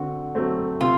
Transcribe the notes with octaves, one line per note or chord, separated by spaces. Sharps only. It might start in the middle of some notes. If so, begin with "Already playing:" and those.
Already playing: D3 A3 C4 F#4
F#3 A3 C4
C3 F4